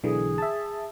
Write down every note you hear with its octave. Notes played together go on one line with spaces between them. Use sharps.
B1 D3 E3 G#4
E5 A5